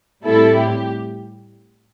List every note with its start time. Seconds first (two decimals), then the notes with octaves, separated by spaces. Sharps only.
0.25 A2 G3 C4 E4 A4
0.56 G4